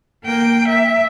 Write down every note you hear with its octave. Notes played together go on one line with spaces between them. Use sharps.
A#3 G5
E5